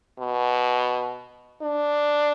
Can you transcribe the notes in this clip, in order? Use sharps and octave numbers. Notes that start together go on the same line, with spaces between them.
B2
D4